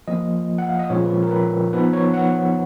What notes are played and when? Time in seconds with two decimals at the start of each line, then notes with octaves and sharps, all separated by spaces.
0.08 F3 A#3 F4 D#5
0.58 F#5
0.69 F5
0.79 D#5
0.90 A#2 F3 G#3 C#4 F4 C#5
1.04 B4
1.23 A#4
1.31 B4
1.72 F3 B3 D#4 B4
1.93 C#5
2.14 F#5